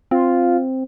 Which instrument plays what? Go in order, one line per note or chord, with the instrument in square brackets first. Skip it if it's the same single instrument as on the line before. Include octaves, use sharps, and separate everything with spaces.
[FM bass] C4 [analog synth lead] F4